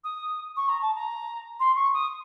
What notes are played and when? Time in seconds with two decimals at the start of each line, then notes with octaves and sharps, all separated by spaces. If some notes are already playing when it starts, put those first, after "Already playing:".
0.04 D#6
0.57 C#6
0.69 A#5
0.82 A5
0.95 A#5
1.60 C6
1.76 C#6
1.94 D#6